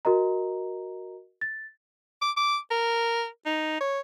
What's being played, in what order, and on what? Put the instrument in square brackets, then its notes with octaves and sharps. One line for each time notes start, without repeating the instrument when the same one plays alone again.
[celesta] F#4 A#4 D#5 A#5
A6
[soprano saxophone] D6
D6
A#4
D#4
C#5